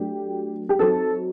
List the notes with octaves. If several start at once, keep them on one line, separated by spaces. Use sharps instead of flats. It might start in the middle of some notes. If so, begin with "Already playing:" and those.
Already playing: F#3 A3 D4 G4
G4
F#3 C4 D#4 A4